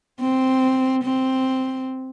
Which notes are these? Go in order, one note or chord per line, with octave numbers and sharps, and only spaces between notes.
C4
C4